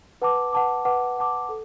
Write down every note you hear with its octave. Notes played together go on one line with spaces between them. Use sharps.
B4 F#5 A5 D6
B4 F#5 A5 D6
B4 F#5 A5 D6
B4 F#5 A5 D6
A4